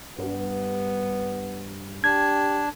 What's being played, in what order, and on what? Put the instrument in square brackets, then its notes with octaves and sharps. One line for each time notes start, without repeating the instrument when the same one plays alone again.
[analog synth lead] G2 [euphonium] B3
[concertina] D4 [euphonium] G4 [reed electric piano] G#6